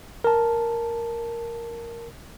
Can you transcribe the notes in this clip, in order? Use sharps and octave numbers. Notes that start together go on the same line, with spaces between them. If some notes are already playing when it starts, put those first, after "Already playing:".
A#4 A5